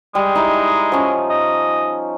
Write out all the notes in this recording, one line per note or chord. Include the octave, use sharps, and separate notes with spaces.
G3 G#3
D#4 E4
F3 C#4
D#5